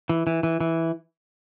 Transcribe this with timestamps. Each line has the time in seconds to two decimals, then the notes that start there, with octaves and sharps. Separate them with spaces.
0.09 E3
0.27 E3
0.43 E3
0.60 E3